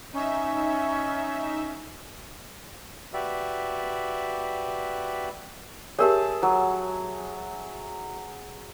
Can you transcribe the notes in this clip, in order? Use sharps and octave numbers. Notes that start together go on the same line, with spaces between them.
C#4 D#4 E5
F#4 G4 B4 D5 E5
G4 G#4 A#4 C#5 E5 A5
F#3